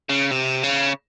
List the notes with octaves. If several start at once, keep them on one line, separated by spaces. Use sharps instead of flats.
C#3
C3
C#3